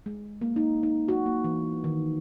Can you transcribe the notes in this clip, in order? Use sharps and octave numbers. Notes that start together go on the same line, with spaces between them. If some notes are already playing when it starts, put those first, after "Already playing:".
G#3
A#3
D#4
D#4
F#4
A#3
E3
D#3